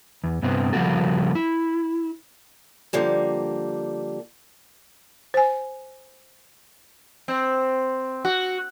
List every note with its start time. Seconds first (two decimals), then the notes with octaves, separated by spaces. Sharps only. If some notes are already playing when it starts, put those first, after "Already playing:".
0.24 E2
0.43 G2 C3 B3 C4
0.73 C#3 F3 G3 A#3 F#4 A4
1.35 E4
2.93 D3 F3 G3 A#3
5.34 C5 G#5
7.28 C4
8.25 F#4